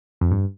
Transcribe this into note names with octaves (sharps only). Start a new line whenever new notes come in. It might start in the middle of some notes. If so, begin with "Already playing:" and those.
F2
G2